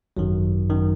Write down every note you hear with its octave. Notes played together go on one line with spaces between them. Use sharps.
G#1 F#2 D#3 F#3
F#2 D#3